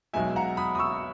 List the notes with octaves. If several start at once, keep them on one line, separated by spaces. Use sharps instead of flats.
B1 B2 G#3 E5 G#5
F#5 A#5
B5 D#6
D#6
C#6 E6